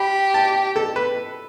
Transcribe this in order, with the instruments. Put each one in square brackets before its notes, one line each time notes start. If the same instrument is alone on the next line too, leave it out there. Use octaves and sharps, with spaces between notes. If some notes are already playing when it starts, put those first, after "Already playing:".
Already playing: [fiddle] G4 [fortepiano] B5
[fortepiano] A5
A4
B4